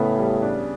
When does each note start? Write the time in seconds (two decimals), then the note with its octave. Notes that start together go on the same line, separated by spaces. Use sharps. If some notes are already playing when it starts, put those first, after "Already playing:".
Already playing: A2 C#3 B3
0.18 G3
0.42 D4